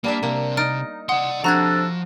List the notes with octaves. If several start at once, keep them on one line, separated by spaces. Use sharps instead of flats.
G3 A#3 D4 E5
C3 A#3
D#4 F6 A6 D7
D5 F#5 C6 D#6
C3 F3 D4 F#4 A4 A#5 F#6 G#6